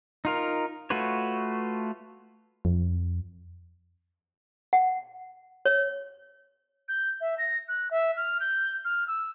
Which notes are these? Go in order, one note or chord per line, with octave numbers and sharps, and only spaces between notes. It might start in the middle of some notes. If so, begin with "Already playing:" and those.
D#4 F4 A#4
A3 F4 F#4 B4 C#5
F2
F#5
C#5
G6
E5
A#6
F#6
E5
F6
G6
F6
E6